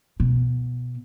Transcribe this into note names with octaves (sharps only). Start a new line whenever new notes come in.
B2